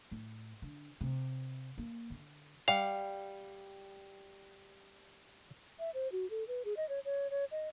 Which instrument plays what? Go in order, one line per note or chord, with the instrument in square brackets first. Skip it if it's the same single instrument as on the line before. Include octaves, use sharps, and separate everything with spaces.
[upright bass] A2
D3
C3
A#3
D3
[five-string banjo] G3 F#5 [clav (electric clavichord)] F5
[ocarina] E5
C5
F#4
A4
B4
G#4
D#5
C#5
C#5
C#5
D#5